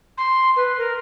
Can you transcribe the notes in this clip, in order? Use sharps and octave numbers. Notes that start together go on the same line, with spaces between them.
C6
B4
A#4